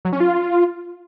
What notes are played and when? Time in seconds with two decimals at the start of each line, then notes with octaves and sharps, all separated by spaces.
0.05 F#3
0.12 C#4
0.20 F4